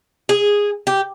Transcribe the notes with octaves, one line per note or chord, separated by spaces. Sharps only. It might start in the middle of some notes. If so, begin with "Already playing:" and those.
G#4
G4